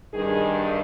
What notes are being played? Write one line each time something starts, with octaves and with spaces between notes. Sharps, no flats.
G2 D#3 G#4